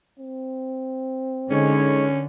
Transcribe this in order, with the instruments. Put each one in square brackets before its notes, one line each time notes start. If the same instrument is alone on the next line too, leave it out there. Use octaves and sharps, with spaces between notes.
[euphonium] C4
[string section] D3 [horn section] G#3 D#4 C#5 [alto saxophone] C#4